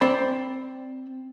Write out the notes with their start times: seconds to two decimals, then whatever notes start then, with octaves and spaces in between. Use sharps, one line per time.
0.01 C4 C5 D5 B5